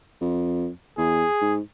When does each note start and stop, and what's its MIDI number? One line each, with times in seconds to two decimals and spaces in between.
0.21 0.69 41
0.98 1.25 40
0.98 1.55 68
1.42 1.60 44